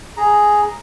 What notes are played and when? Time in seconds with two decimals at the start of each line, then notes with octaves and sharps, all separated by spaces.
0.17 G#4 A#5